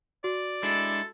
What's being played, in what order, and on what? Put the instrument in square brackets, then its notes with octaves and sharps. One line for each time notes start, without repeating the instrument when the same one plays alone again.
[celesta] F#4 [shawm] D5
[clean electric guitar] G#3 D4 E4 [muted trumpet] A4